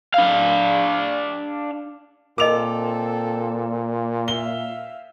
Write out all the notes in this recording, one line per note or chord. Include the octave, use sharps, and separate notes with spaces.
D4 F5
A#2 C4 A4 A#4 D#5 D6 F7
E5 F5 G7